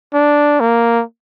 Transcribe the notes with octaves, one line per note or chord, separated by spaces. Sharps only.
D4
A#3